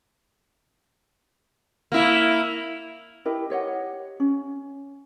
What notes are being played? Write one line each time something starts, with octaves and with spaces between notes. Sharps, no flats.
A#3 E4
E4 G4 A#4 D#5
G4 C#5 D#5 F#5
C#4